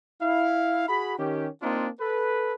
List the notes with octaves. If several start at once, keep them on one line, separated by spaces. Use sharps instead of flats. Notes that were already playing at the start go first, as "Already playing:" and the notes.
E4 F5
F#4 G#4 B5
D#3 C#4 G4
A#3 C4 D4 D#4 F4
A4 B4